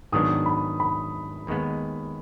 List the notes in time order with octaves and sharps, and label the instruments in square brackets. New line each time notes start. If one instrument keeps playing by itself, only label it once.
[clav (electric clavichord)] G#2 D#3 F#3 B3 D4 [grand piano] D#6
[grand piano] B5
B5
[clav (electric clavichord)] D#2 D#3 G#3 B3